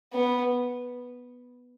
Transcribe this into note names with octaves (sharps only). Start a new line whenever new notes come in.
B3